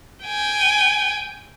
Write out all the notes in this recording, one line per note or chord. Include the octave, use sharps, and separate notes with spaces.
G5 G#5